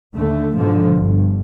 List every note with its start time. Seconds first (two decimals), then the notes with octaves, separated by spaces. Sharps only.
0.15 D#2 D3 A3
0.56 G#2 B2 D3 F3
0.95 G1 G2